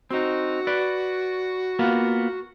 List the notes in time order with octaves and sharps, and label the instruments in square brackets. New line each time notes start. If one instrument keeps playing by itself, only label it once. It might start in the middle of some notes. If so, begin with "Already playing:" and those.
[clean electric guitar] C4 D#4 [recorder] F#4
[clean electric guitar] B4 D5
A#3 B3 F4